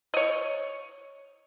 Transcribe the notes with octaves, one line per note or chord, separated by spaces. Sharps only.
C#5 D#5